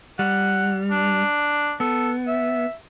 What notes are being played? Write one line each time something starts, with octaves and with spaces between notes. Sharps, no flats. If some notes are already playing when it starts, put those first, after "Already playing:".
G3 F#5
D4
B3 A4
E5